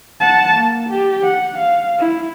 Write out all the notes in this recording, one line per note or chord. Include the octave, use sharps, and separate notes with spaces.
F#5 A5
A#3
G4
F#5
F5
E4